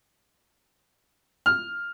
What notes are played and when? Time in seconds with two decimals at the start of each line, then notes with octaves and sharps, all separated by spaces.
1.46 F6